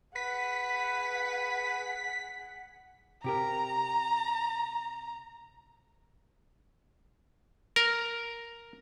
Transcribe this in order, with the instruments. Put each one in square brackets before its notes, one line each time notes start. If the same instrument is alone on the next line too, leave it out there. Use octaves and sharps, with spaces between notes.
[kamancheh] G#4 F#5 [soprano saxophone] B4 [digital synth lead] B6
[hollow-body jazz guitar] C3 G4 A#4 [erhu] A#5
[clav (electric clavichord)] A#4